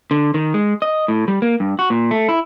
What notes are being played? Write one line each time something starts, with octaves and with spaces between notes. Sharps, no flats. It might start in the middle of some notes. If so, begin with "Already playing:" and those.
D3
D#3
G#3
D#5
A2
G3
A#3
G2
F#4
A#2
A3
E4